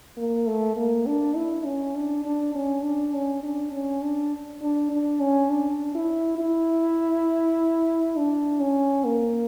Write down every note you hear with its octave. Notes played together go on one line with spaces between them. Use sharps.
A#3
A3
A#3
D4
E4
C#4
D4
D4
C#4
D4
C#4
D4
C#4
D4
D4
D4
C#4
D4
E4
E4
D4
C#4
A#3